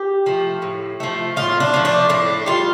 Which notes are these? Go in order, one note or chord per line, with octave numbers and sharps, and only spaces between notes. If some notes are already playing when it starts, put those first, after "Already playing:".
Already playing: G4
F3 A3
A2
F3 A3
A2 F4
D4
F3 A3
D4
A2 D4
G3 F4